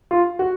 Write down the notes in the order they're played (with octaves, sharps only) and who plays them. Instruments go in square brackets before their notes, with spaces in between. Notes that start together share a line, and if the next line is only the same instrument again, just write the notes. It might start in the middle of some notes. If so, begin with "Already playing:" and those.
[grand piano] F4
F#4